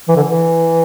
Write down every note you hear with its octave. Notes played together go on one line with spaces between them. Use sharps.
E3
D3
E3